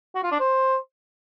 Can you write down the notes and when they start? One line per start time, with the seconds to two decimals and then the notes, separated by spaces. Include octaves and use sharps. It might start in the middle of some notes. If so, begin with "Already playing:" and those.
0.15 F#4
0.23 F4
0.32 D4
0.40 C5